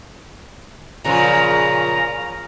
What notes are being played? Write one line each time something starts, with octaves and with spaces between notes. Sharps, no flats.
A#2 C#3 F3 A#5